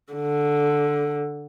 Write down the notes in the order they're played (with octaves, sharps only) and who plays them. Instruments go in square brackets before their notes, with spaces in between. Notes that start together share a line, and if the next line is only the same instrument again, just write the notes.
[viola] D3